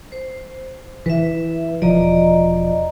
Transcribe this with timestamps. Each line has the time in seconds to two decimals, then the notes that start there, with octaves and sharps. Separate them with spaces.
0.12 C5
1.06 E3 B4 E5
1.82 E1 F3 D5 D#5 A#5